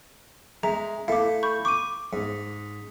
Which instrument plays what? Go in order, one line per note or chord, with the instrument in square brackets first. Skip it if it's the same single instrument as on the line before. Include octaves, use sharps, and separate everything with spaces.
[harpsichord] G#3 [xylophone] E5 A#5
[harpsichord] A3 E4 [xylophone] F5 D6
[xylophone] B5 C#6 G6
[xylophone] C#6 D#7 [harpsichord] D6
[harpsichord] G#2